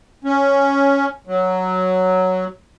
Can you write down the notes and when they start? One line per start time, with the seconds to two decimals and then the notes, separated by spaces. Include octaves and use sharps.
0.24 C#4
1.27 F#3